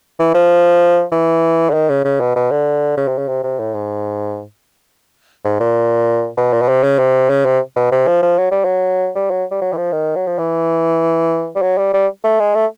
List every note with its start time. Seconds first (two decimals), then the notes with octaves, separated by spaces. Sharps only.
0.19 E3
0.34 F3
1.12 E3
1.70 D3
1.74 D#3
1.89 C#3
2.05 C#3
2.20 B2
2.36 B2
2.51 D3
2.97 C#3
3.08 C3
3.18 C#3
3.28 C3
3.44 C3
3.59 A2
3.74 G#2
5.45 G#2
5.60 A#2
6.37 B2
6.53 A#2
6.62 B2
6.68 C3
6.84 C#3
6.99 C3
7.30 C#3
7.45 C3
7.76 B2
7.92 C3
8.07 F3
8.22 F3
8.38 F#3
8.51 G3
8.65 F#3
9.15 G3
9.31 F#3
9.51 G3
9.62 F#3
9.73 E3
9.77 F3
9.92 D#3
10.16 F#3
10.27 F3
10.39 E3
11.56 G3
11.62 F#3
11.78 G3
11.93 G3
12.24 A3
12.40 G#3
12.55 A3